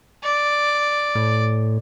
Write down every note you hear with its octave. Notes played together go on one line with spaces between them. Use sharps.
D5
A2